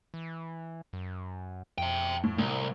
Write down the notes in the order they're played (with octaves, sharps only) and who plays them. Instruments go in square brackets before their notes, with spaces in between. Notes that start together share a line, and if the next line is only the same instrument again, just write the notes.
[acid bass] E3
F#2
[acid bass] F2 [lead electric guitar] E5 G5
[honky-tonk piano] A2
[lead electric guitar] C2 [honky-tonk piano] A2